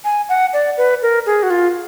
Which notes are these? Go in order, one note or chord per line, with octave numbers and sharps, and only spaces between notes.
G#5
F#5
D5
B4
A#4
G#4
F#4
F4